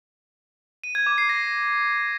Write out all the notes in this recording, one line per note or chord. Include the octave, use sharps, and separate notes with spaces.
D#7
G#6
D6
C7
A#6